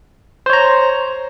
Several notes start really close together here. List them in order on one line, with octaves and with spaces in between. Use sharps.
C5 C#5 A#5